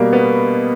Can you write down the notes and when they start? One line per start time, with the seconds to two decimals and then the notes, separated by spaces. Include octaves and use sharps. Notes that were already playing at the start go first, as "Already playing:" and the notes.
Already playing: B2 G3 A#3
0.13 B3